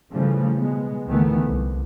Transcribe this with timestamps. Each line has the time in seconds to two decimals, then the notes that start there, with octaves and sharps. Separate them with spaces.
0.11 C#3 E3 F3 G3 A3
0.56 B2 G#3 B3
1.07 D2 D#3 E3 A3 B3
1.44 C2